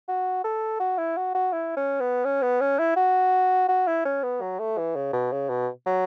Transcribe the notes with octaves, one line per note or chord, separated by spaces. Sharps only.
F#4
A4
F#4
E4
F#4
F#4
E4
C#4
B3
C#4
B3
C#4
E4
F#4
F#4
E4
C#4
B3
F#3
A3
E3
C#3
B2
C#3
B2
F#3